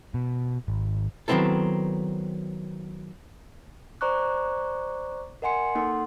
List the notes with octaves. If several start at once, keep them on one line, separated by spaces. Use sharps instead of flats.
B2
G#1
D#3 F#3 B3 C4 E4 A4
C5 D5 A#5 C#6 D6 F#6
A#4 D#5 F#5 G#5 C6 C#7
A#3 D#4 A4 F#5 C6